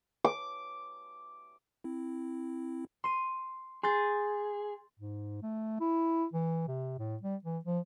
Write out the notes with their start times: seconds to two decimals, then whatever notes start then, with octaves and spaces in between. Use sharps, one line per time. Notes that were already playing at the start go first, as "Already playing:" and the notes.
0.24 D6
1.84 C4 E4
3.04 C6 D#7
3.83 G#4 C6 G6 A6
4.99 G#2
5.42 A3
5.80 E4
6.33 E3
6.68 C3
6.99 A2
7.23 G3
7.45 E3
7.65 F3